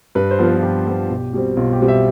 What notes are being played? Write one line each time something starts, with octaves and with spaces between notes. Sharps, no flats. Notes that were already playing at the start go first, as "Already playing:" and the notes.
G2 B4
C5
F3 B3 F4
B4
F4
G2 G4
F3 B3 F4
B1
B2 G3 C4
B1 F4
G4
B2 G3 C4
E5